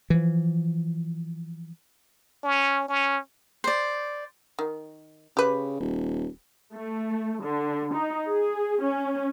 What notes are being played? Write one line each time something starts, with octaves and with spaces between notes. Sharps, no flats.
E3 F3
C#4
C#4
C5 D5
D#3
C#3 G4 B4
D#1
A3
D3
D#4
G#4
C#4